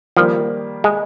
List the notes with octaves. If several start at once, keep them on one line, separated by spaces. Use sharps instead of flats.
D#3 F3 G3 A#3
G#3